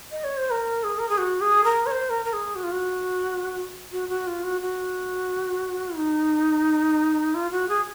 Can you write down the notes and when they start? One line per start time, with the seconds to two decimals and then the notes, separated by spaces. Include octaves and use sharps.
0.11 D#5
0.24 C#5
0.37 C5
0.51 A#4
0.84 G#4
0.99 A#4
1.09 G#4
1.18 F#4
1.41 G#4
1.64 A#4
1.86 C#5
1.91 C5
2.10 A#4
2.25 A#4
2.33 G#4
2.55 F#4
2.63 F4
2.72 F#4
3.92 F#4
4.09 F#4
4.27 F4
4.43 F#4
4.61 F#4
5.97 D#4
7.34 F4
7.51 F#4
7.69 G#4